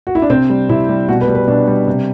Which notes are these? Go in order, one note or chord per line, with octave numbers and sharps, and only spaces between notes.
F#4
E4
D4
C3 C4
G3
C3 E4
G3
B2 F#4
B4
G3
B4
B2 D4
G3
C3